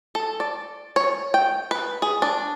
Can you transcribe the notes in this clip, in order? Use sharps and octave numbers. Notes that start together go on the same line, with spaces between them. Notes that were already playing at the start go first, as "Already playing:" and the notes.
A4
D5
C#5
G5
B4
G#4
D4